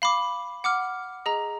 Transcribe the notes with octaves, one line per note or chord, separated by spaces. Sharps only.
F5 B5 D6
F#5 D6 F6
G#4 D#5 A#5